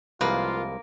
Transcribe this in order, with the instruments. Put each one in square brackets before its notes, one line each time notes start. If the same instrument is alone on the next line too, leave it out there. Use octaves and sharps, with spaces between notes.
[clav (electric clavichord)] C2 F3 G#3 [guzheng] A#3 [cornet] F4 [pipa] B4